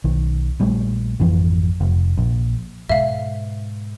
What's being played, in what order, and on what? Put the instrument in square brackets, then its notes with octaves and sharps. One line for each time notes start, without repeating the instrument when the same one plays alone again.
[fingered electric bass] B1 D#3
A#1 G3 A3
G#1 F2 E3 F3
F1
A#1
[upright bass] G#2 B2 [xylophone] E5 F5